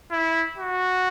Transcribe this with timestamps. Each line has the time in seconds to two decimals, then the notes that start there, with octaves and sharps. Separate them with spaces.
0.12 E4
0.58 F#4